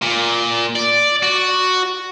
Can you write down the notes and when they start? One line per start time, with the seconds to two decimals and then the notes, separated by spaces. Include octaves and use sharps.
0.02 A#2
0.76 D5
1.23 F#4